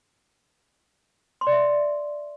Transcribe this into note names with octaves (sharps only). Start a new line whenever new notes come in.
C6
D5
E5